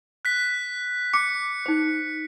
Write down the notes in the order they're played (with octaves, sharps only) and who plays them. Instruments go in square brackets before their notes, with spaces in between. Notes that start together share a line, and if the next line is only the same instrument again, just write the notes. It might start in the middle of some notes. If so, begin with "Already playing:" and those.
[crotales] F#6 B6
[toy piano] D6 [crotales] C#7
[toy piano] D#4 C5